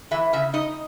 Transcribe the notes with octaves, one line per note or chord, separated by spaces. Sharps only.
E3 E5
C#3 E5
D#4 D#5